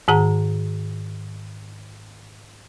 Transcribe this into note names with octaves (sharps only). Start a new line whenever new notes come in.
G#2 D#3 G#4 F#5 A#5